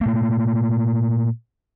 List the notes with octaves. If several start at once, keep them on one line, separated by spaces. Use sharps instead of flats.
A#2 A3 A#3